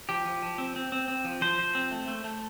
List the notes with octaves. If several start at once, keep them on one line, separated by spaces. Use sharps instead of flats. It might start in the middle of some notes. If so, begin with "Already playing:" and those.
F3 G4
F3
F3
C4
C4
C4
C4
F3
F3 C5
F3
C4
A3
A3
A3